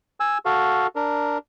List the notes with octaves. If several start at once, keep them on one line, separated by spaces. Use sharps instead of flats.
G#5 E6
F#4 A4 F5
D4 A#4